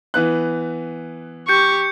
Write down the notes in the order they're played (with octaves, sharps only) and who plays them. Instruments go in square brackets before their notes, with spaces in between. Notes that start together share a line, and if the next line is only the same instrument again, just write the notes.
[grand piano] E3 B3 F#6
[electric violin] G4 C#6 [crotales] G6 C#7